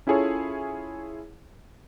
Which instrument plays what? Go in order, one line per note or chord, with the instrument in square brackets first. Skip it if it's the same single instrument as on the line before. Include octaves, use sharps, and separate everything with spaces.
[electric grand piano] C#4 E4 F4 G#4 A4 C#5